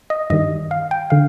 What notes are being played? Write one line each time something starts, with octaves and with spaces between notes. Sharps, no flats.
D#5
G2 D#3 G3 D#5
F5
G5
D3 F5